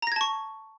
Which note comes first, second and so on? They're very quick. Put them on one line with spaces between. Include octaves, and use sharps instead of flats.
A#5 A#6 G#6 A5 C#6